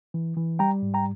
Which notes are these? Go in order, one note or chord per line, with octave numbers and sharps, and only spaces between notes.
E3
E3
G3 G5 A#5
G#2
G5 A#5